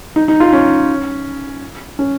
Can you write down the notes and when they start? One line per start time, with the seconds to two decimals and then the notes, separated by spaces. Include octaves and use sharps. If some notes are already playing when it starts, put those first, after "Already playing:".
0.16 D#4
0.28 D#4
0.40 F4
0.53 C#4
1.99 C#4